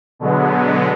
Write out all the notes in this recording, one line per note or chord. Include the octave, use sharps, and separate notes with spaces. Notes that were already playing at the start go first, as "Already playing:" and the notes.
B2 D3 F#3 G#3 B3